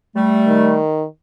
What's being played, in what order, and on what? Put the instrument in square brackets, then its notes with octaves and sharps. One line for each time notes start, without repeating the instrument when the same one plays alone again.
[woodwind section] G3 A3
[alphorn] D#3